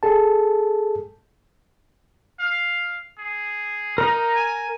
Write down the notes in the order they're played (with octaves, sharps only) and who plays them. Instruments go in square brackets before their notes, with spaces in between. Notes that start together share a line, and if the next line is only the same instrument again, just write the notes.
[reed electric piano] G#4 A4 A5
[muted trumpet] F5
G#4
[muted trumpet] D#4 [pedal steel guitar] A#4 A#5
[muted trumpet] G#5